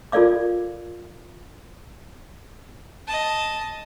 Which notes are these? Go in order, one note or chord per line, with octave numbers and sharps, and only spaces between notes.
F4 A4 A#4 D5 F5 D6
D#5 A5